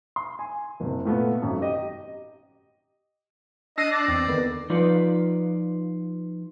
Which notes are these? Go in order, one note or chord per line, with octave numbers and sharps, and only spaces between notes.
C6
G#5
F#1 C3
A#2 A3 B3
G#1 F#2
G4 D#5
D4 D#5 A5 E6 F#6 A#6 C7
D5
E2 C4
D3 D#3 B3
F3 D#4 F4 B4 D5